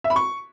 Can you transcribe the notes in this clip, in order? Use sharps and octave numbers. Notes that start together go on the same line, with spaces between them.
E5
B5
C#6